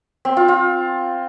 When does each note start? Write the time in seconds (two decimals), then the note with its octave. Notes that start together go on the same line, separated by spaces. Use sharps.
0.25 C4
0.37 F4
0.48 F4